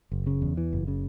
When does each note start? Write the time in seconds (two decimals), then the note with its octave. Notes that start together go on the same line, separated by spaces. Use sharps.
0.12 F#1
0.27 C#3
0.42 E2
0.57 E3
0.73 F#1
0.88 C#3